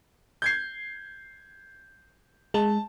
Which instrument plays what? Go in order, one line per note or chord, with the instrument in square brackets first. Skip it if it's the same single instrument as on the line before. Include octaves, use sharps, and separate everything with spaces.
[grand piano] G6 G#6 C7
[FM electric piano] G#3 [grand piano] A5